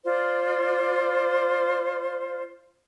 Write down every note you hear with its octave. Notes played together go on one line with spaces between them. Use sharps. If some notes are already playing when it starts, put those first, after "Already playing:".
F4 C5 D5